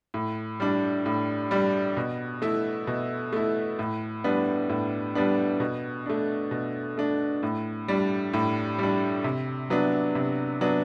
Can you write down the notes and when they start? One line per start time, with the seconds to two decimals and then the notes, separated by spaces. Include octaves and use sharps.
0.14 A2
0.60 G3 D4
1.06 A2
1.51 G3 D4
1.97 B2
2.42 A3 E4
2.87 B2
3.33 A3 E4
3.79 A2
4.24 G3 B3 D4
4.69 A2
5.15 G3 B3 D4
5.60 B2
6.06 A3 D4
6.51 B2
6.97 A3 D4
7.43 A2
7.88 G3 D4
8.33 A2
8.78 G3 D4
9.24 C3
9.70 F#3 B3 D4
10.15 C3
10.61 F#3 B3 D4